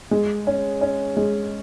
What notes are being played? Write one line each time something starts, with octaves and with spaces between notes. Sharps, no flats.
G#3
C#4
C#4
G#3